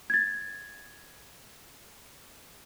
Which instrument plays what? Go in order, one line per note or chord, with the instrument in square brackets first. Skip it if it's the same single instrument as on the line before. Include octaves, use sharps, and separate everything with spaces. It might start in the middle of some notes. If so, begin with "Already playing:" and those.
[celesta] G#6 A6